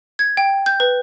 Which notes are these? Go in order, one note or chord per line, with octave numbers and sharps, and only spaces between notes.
G#6
G5
G6
B4